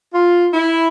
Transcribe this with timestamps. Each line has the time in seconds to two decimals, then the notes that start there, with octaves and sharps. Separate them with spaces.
0.13 F4
0.53 E4